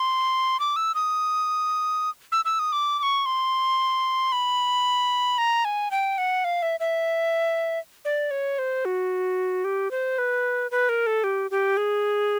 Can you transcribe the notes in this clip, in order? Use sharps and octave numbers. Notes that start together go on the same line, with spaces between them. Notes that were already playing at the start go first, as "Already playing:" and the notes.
Already playing: C6
D6
E6
D#6
E6
E6
D#6
D6
D6
C#6
C6
B5
A#5
G#5
G5
F#5
F5
E5
E5
D5
C#5
C5
F#4
G4
C5
B4
B4
A#4
A4
G4
G4
G#4